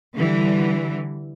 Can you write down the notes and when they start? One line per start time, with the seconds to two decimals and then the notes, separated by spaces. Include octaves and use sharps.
0.16 D3 E3 G3